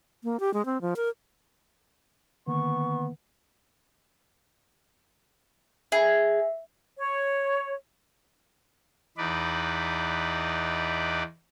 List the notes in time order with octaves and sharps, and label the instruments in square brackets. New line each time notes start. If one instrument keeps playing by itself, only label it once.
[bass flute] A#3
G4
G#3
C4
F3
A#4
[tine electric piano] D3 D#3 A#3 [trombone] B3 [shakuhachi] C#6
[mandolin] G#4 [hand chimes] E5
[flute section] C#5
[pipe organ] E2 D#4 B4 D5